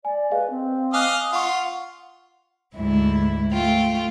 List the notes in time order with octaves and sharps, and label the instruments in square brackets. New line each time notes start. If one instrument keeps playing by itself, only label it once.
[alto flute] D5 [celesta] G#5
[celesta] G#4 D#5 F5 [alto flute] B4
[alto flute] C4
[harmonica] D#5 F5 [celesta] G#5 D6 F#6
[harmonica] F4 [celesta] F5 C#6 [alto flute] F#5
[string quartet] D2 G#2 E4
A3 F4 G5